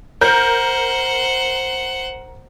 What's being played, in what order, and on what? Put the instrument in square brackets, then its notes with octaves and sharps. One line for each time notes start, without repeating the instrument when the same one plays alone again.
[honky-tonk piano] A#4 G6 [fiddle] C5 F#5